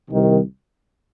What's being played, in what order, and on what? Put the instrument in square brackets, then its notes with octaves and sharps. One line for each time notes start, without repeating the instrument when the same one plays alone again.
[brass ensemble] C2 C3 D#3